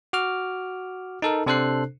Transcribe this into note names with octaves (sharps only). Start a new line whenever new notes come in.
F#4 D6 F6
D#4 A4 A#4
C3 D4 A4 C5 F#6 C7